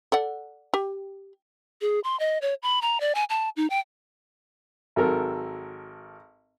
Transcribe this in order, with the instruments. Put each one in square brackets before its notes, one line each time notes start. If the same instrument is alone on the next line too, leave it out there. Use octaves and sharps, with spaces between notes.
[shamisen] A4 D5 F#5
G4
[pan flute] G#4
C6
D#5
C#5
B5
A#5
D5
G#5
A5
D#4
G5
[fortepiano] G#1 F#3 A4 A#4